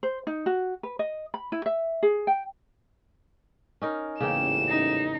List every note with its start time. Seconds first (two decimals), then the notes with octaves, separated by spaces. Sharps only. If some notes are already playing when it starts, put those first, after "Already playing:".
0.03 C5
0.27 D#4
0.46 F#4
0.83 B4
0.99 D#5
1.34 B5
1.52 E4
1.66 E5
2.03 G#4
2.27 G5
3.82 C#4 D#4 A#4
4.21 A1 E2 G#2 C#3 A#3 G5 E7
4.69 D#4